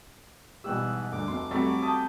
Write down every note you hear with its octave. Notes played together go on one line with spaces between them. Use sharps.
G#2 B2 E3 G3 G4 E6 F#6
D2 G2 D6
F1 F#4 C6
F#3 G3 A3 C4 C#5
A5 D#6 G6